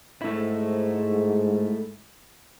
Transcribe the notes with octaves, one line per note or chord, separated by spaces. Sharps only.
G#2 A3 E4